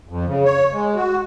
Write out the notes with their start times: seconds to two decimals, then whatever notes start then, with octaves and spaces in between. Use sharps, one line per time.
0.09 F2
0.27 C#3
0.45 C#5
0.73 G#3
0.96 F#4